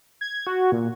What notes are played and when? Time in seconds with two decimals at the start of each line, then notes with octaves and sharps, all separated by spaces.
0.21 G#6
0.47 F#4
0.72 A#2